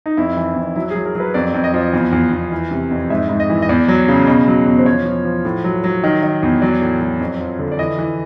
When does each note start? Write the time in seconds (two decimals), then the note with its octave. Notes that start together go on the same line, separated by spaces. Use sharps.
0.06 D#4
0.17 F2 E4
0.37 E3
0.56 F2
0.76 F#3 E4
0.90 G#4
0.95 F#3
1.06 A#4
1.15 F#3 B4
1.34 F2 D5
1.54 F2
1.64 D#5
1.74 F3
1.93 E2
2.12 E2
2.32 E2
2.52 E3
2.71 C3
2.91 F2
3.10 G#2 E5
3.29 G#2
3.40 D#5
3.50 E3
3.62 D#5
3.69 E2 D5
3.88 F#3
4.08 C#3
4.27 B2
4.48 F#3
4.66 E2
4.78 C5
4.86 F3 C#5
5.05 F3
5.25 F3
5.45 A2
5.64 F#3
5.84 F#3
6.04 D#3
6.23 D#3
6.43 E2
6.62 F#3 D5
6.81 A2
7.01 F#3
7.20 F2
7.40 F3
7.59 D3
7.72 D5
7.79 E3 D#5
7.98 E3